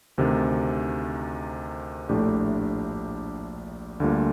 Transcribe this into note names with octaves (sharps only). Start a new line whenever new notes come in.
D2 C3 D#3
A#1 A2 A3 D4 G4
D2 D3 G3 A#3 F4